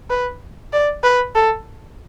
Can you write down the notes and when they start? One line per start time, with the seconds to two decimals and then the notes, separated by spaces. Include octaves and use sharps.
0.10 B4
0.73 D5
1.04 B4
1.35 A4